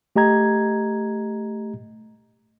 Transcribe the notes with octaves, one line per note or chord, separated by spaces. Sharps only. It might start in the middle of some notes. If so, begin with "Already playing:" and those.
A3 G4 D#5 A#5 G#6